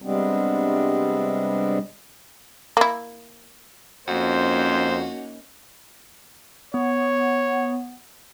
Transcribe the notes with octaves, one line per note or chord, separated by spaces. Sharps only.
C3 G3 G#3 B3 C4 D4
A#3 E4
F2 A#3 C#4 D#4 F#4 C5
B3 C#5